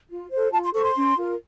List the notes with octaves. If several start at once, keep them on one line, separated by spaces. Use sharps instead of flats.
F4
A4 C5
F4 A5
C6
A4 C5 C#6
C6
C#4
F4 A#4